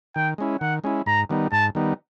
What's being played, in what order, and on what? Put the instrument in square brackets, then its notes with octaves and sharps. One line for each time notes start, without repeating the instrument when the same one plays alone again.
[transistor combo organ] D#3 [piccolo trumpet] G5
[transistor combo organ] G#3 C#4 E4
[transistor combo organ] D#3 [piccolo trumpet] F#5
[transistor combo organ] G#3 C#4 E4
[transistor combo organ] G#2 [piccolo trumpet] A#5
[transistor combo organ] D#3 G3 B3 D#4
[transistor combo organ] G#2 [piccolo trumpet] A5
[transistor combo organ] D#3 G3 B3 D#4